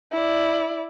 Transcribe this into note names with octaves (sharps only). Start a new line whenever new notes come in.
E4 D5